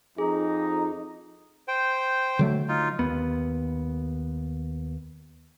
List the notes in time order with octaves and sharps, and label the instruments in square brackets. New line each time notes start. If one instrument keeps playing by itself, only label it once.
[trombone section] F2 D#4 [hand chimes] G#4
[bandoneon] C5 G5
[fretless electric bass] D3 F#3 A3
[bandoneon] D#4 F4
[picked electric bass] D#2 B3